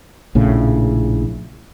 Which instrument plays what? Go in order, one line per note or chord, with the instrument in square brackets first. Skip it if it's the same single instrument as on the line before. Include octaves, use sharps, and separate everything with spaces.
[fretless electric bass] A#1 A2 C#3